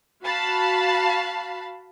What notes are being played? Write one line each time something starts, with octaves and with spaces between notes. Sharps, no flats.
F#4 F5 A5 B5